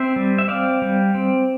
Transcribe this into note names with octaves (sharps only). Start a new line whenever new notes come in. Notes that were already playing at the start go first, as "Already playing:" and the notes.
Already playing: C4 C5 E5
G3
E5
C4 D5 F5
G3
C4